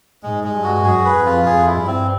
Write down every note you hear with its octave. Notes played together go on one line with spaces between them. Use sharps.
G#2 G#3
G#3
G2
F#4
F#2 G#4
B4
F2
F4
F2 G#4
E4
G2
C4